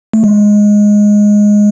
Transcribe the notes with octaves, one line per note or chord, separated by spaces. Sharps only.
A3
G#3